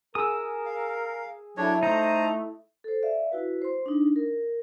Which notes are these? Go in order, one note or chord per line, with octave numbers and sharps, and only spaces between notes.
G#4 A#4 D#6 E6
F5
F#3 D4 E4 A4 C#5 D#5
A3 D#4 C5 A5 A#5
A4 C5
D5 E5 F5
E4 F#4 B4
C5 C6
D4 D#4
A#4